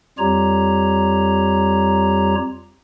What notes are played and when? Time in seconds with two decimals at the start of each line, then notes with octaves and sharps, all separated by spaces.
0.18 F2 G3 F4 G4 C#5 A#5